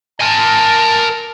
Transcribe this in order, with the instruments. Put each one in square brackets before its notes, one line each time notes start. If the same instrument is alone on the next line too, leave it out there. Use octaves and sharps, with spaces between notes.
[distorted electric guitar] A#4 G#5 [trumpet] A5